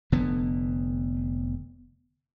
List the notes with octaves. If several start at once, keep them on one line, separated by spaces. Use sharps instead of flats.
F1 D3 B3